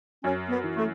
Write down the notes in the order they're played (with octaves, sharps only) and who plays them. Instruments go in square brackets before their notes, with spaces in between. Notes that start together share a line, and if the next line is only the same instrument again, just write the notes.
[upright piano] F#2 [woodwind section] C#4
[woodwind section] B3
[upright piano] E3
[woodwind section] A3